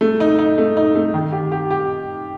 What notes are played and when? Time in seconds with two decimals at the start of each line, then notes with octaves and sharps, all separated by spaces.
0.01 A3
0.20 D#4
0.39 D#4
0.58 A3
0.77 D#4
0.95 A3
1.14 D#3
1.32 G4
1.52 G4
1.71 G4